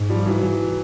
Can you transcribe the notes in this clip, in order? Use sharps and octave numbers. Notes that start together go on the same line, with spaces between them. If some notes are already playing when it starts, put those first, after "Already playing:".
Already playing: G#2
F3 G3
E3 F#3
E3 F#3